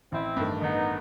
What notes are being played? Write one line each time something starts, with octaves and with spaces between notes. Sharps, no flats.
A1 C4 E4
G2 D#3 A3
A1 B3 D#4